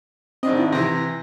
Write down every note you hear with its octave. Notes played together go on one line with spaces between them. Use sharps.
G#1 C4 D4 D#5
E4
C3 E3 A#6